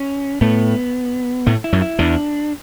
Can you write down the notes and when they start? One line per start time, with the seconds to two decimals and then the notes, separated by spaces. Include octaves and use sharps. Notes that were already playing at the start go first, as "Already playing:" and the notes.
Already playing: C#4
0.41 A2 A3 B3
1.47 A2 A3
1.64 E4
1.73 F#2 F#3
1.82 E4
1.99 E2 E3 D4